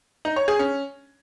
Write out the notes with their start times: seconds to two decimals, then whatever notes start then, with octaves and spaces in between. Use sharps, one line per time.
0.25 D#4
0.36 C#5
0.48 G#4
0.59 C#4